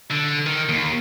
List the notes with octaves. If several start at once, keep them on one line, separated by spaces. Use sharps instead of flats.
D3
D#3
D#2